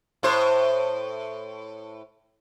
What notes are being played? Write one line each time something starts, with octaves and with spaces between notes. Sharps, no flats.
A2 C5